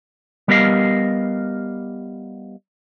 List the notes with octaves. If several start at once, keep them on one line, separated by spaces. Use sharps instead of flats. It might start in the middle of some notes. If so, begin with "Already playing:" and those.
G3 B3 G4 A#4 D#5 F5